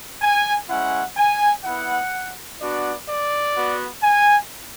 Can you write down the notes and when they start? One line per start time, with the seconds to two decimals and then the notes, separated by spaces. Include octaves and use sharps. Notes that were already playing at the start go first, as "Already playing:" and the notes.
0.22 G#5
0.69 G#3 C#4 E4 F#5
1.17 G#5
1.65 B3 E4 F#5
2.61 B3 D4 F#4 D5
3.08 D5
3.56 B3 F#4
4.03 G#5